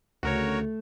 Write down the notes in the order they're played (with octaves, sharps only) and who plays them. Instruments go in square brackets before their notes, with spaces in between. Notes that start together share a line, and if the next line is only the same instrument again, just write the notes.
[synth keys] D2 C#3 [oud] A3 [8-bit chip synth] F#4 A#4 C#5